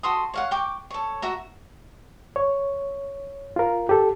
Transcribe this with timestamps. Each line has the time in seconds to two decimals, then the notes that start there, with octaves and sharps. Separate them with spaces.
0.03 F#4 A4 C6 D#6
0.34 C#5 F5 F#5
0.51 G5 C#6 D6
0.90 A4 C#5
1.22 F#4 E5 A#5
2.36 C#5
3.56 F4 A#4
3.89 G4 A4